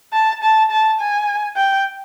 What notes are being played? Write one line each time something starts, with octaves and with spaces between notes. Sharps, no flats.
A5
A5
A5
G#5
G5